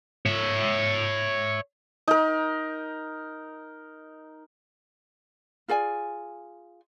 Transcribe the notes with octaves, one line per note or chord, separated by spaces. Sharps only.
C#5 E5
D#4 A#4
F4 G#4 D5 G#5